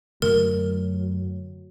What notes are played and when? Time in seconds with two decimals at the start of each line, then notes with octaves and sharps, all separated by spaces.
0.22 F#2 D3 F#3 A3 A#4